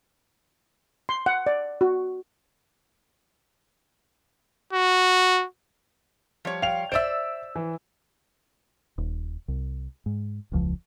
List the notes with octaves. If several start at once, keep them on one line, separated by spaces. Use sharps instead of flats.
C6
F#5
D5
F#4
F#4
F3 G3 C#5
F5 G5 F7
C5 D5 E5 E6 D7
E3
D#1
C2
G#2
E1 C#2 F3